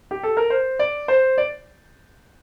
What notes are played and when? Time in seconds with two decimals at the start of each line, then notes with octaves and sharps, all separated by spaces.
0.11 G4
0.23 A4
0.37 A#4
0.50 C5
0.79 D5
1.08 C5
1.38 D5